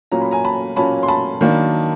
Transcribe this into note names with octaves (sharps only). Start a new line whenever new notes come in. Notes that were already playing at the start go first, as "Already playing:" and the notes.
A#2 F#3 A#3 C#4 A#5
B5
G#5 A#5
A5 B5
A#2 F#3 A#3 C#4 A5 B5
C6
A5 B5
D#3 F#3 A#3 D4